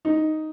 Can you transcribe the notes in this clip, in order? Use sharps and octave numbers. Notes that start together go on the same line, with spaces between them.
D#4